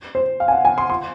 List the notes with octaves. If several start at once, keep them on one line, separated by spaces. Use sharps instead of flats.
C5
F5
G#5
F#5
G#5
C6
C6